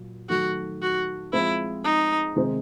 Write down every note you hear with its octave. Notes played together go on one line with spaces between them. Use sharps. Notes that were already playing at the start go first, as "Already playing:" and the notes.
Already playing: A#2 F#3
D#3 F#3 A3 F#4
F#4
F3 G#3 C4 E4
D#4
C3 D#3 G#3 C4 D#4